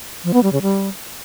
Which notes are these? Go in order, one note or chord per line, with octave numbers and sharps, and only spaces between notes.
F3
B3
G3
C#3
G3